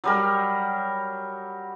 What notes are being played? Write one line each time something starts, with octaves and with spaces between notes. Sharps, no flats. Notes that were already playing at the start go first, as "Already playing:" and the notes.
F#3 G3 A#4